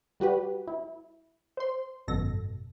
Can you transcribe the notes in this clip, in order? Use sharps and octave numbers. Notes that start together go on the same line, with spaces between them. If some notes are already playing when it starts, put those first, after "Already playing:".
G3 F#4 G4 B4
E4
C5 C6
G#1 F#2 B2 A4 A#6